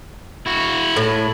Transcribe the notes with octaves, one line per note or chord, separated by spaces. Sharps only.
E4 F#4
A2